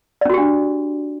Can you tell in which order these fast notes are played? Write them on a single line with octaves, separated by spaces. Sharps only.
D5 C#4 F#4 G4 D4